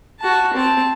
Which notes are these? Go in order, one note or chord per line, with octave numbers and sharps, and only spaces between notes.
F#4 A5
C4 A5